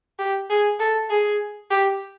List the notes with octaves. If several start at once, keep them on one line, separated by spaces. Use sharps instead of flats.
G4
G#4
A4
G#4
G4